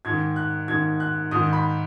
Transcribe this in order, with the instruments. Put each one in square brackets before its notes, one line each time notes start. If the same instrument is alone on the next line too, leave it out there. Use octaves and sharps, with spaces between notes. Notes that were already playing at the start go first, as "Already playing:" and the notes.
[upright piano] G#2 D#3 G#6
F#6
G#2 D#3 G#6
F#6
G#2 D#3 D#6
B5